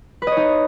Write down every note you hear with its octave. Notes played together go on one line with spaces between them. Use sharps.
D#4 B4 C#5 D#5